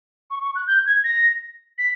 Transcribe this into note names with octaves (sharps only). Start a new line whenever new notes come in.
C#6
C#6
F#6
G6
G#6
A#6
B6